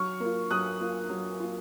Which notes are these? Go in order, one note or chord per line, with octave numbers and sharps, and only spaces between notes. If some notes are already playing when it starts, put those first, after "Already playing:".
Already playing: F#3 C#6 F6
A#3 F4
F#3 D#6 F#6
A#3 F4
F#3
A#3 F4